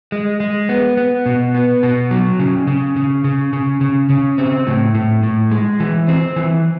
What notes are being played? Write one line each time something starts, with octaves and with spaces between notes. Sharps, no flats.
G#3
G#3
B3
B3
B2
B3
B2
F#3
C#3
C#3
C#3
C#3
C#3
C#3
C#3
C4
A2
A2
A2
G#3
E3
C4
E3